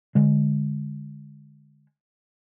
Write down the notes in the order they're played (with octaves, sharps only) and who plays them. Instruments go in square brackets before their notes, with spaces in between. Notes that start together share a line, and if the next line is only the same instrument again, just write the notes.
[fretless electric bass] D3 G#3